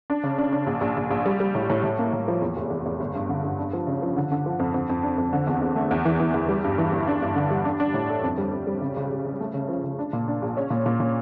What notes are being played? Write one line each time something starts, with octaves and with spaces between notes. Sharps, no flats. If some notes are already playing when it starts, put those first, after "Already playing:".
D4
C#3
D4
D4
A#1
A#1
A#1
A#1
G3
G3
A2
A2
A2
A#3
A2
F3
E2
F1
E2
E2
G1
G2
D3
G2
D4
F3
C#3
F3
D3
D3
F3
F2
F2
F2
D4
F2
D3
E2
E2
A3
E2
E3
E3
E2
G3
G2
E3
G1
D4
G2
D3
G3
D4
D4
A2
A4
F2
G3
F2
G3
C#3
C#2
C#2
C#3
A3
C#3
F3
C#3
D4
A#2
D4
A#1
C#4
A#2
A#2
A#2